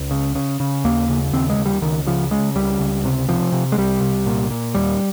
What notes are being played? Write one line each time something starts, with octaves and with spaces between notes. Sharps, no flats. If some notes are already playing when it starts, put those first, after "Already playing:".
Already playing: C#2
C#3
C#3
C#3
D#2 A#3
C#3
D#2 C4
G#3
D#2
G3
C#2 D#3
C#3 F3
C#3 G#3
C#2 G3
C#2
C3
C3 F3
C3
G#3
C2 G3
C2
A#2
A#2
D#2 G3